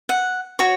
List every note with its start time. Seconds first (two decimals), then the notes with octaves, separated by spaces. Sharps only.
0.09 F#5
0.59 F#4 C#5